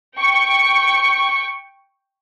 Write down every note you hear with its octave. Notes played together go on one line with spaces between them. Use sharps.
G5 C#6